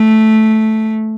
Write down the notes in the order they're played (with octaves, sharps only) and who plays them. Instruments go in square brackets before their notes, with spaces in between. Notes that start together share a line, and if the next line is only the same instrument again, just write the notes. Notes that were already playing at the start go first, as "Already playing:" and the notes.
Already playing: [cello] A3